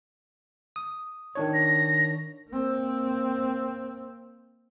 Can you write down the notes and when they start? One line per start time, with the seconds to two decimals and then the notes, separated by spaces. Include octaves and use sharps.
0.76 D#6
1.35 D#3 D4 C#5
1.54 A#6
2.49 A#3 C4